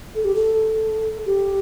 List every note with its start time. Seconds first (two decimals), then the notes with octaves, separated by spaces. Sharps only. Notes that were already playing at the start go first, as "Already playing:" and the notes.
0.15 A4
0.25 G4
0.35 A4
1.26 G4